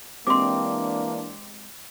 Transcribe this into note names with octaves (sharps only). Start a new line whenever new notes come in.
E3 G#3 A#3 C4 D4 G4 C6 D6